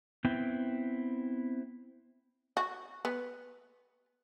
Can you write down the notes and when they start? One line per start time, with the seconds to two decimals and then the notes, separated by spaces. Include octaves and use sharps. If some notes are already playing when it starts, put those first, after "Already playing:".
0.24 B3 C4 E4 G5
2.57 F#4
3.05 B3